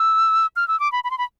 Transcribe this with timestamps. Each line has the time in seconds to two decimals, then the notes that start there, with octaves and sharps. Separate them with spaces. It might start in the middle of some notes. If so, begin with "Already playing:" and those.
Already playing: E6
0.56 F6
0.68 E6
0.80 D6
0.92 B5
1.04 B5
1.11 C6
1.18 B5